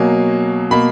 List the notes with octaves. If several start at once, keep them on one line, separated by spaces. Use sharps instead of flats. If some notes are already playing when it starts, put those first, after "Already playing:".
Already playing: B2 F#3 A#3 G#5
B2 A#3 B5